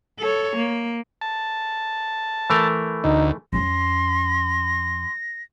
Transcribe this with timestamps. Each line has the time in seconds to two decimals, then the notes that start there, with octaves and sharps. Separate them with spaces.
0.20 A4 C#5
0.56 A#3
1.21 A5
2.50 E3 A3 A#4
3.04 D2 D#4
3.53 F2 C#4 C6 A#6